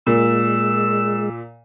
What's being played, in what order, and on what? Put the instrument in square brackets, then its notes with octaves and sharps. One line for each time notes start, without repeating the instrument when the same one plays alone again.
[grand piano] A#2 [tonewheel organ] G#3 [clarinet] E6